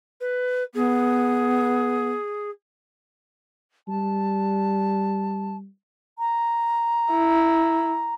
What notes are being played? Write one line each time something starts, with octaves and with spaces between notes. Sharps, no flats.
B4
B3 G#4
G3 A5
A#5
E4